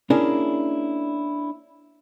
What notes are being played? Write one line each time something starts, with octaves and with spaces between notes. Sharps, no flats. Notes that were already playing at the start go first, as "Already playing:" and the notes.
A#3 C#4 D4 E4 G#4 A#4